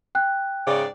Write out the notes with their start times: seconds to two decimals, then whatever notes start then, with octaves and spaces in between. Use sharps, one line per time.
0.15 G5 F#6
0.67 G#2 C#3 D5